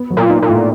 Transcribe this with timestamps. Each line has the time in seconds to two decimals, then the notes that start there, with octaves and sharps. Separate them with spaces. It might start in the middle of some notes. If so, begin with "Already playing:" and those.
Already playing: B3
0.10 F#3
0.17 A#2
0.29 D#4
0.42 A#2
0.49 A2